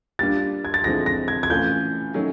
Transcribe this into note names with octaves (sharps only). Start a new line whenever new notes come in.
G3 A#3 D4 F4 A6
G#6
A6
D3 F3 G#3 C4 E4 A#6
A#6
G#6
G#6
A2 E3 A3 C#4 F4 G6
D#3 F#3 A3 C#4